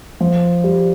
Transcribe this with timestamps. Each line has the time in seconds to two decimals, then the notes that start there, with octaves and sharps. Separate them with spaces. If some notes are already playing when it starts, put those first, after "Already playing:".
0.20 F3
0.64 G3